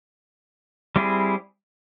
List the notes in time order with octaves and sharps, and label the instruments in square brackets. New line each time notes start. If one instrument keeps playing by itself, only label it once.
[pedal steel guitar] G3 C4 E4 G#4